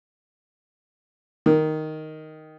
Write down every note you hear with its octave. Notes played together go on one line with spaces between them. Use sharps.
D#3